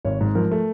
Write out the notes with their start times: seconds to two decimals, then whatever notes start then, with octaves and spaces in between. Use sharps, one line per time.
0.05 G#1 C#5
0.21 G#2
0.35 F3 A#4
0.51 A3